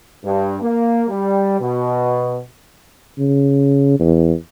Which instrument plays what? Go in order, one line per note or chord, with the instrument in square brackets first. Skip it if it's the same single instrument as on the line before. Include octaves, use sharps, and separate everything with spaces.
[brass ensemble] G2
A#3
G3
B2
[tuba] C#3
E2